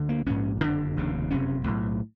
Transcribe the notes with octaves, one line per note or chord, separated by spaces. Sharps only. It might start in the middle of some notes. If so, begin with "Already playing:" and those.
Already playing: D2 D3
A#3
A#1 G#2 C#4
F#1 F2 D3 D4
F1 D#2 C#3
F#1 F2 C3 C#4
B1 A2